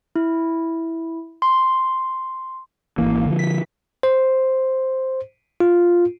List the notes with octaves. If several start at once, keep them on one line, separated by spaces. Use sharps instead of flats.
E4
C6
G#1 E3 A#3
D3 F3
B6
C5
F4